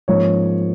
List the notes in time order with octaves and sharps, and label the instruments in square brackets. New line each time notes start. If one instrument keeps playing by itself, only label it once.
[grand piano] G#2 F3 A#3 C#4 C#5